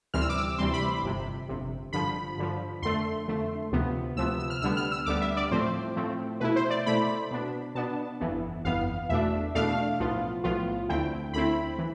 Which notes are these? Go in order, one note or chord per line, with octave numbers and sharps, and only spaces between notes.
D2 C3 E3 G3 C4 F6
E6
D6
E6
D2 C3 E3 G3 C4 C6
B5
G1 F2 C3
G1 F2 C3
G2 D3 F3 B5
G2 D3 F3
F2 D3 A3 C6
F2 D3 A3
D2 C3 F3 B3
D2 C3 F3 B3 E6
E6
F6
D2 D3 G3 B3 E6
F6
E6
D2 D3 G3 B3 D6
E5
D5
A2 F3 A3 C4 C5
A2 F3 A3 C4
B2 A3 E4 B4
C5
D5
B2 A3 E4 B5
B2 B3 D4
B2 B3 D4 A5
G1 F2 E3 B3
G1 F2 E3 B3 F5
E2 B2 A3 D4 E5
E2 B2 A3 D4 F5
B1 A2 F3 B3 F4
B1 A2 F3 B3 F4
D2 D3 A3 C4 E4 G5
D2 D3 A3 C4 E4 B5
E3